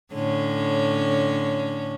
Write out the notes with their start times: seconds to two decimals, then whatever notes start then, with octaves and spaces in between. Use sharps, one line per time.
0.14 A2 D3 C#4